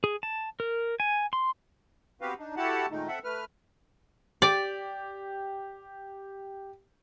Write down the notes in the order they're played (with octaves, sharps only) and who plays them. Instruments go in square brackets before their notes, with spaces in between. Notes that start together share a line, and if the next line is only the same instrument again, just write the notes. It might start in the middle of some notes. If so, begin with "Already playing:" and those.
[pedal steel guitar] G#4
A5
A#4
G#5
C6
[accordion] B3 C4 F#4 G4 B4 F5
D4 D#4
E4 F#4 G4 A4 F#5 A5
A#2 D#3 G#3 A3 D#4
C4 A4 E5 F#5
A3 B4 F6
[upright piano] G4 [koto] D5